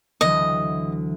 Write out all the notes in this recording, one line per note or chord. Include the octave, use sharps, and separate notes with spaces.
D2 E3 F#3 D#5